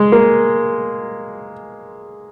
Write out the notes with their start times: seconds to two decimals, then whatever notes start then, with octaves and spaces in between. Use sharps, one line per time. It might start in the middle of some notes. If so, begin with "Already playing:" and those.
Already playing: G#3
0.12 A#3